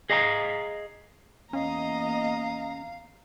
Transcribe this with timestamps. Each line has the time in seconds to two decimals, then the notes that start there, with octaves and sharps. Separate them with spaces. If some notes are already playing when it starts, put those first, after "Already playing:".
0.10 G#4 D#5 F5 G#5 A#5
1.53 E2 A#3 C#4 D#5 F5 A#5